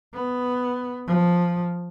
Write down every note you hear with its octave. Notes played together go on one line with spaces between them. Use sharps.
B3
F3